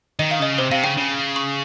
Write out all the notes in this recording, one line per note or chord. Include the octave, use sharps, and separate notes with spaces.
D#3 D#5
F5
C#3 D#5
C3 C5
C3 F5
C#3 G5
C#3
C#6